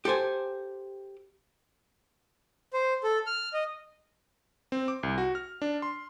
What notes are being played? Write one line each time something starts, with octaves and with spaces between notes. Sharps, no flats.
G4 A4 C5 G#5
C5
A4
F6
D#5
C4
D6
C2
F#4
F6
D4
C6